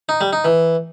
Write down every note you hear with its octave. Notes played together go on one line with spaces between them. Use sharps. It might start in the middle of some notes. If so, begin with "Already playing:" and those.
D#4
G3
D#4
E3